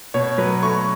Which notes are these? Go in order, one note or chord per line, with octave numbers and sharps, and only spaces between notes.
B2 C#5
F#3 B4
A3 C#6